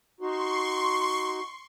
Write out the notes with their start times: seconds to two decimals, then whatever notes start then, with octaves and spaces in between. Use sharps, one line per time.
0.20 D#4 F#4 C6 C#6